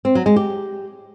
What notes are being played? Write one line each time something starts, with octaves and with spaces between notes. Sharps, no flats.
C4
F#3
G#3
G4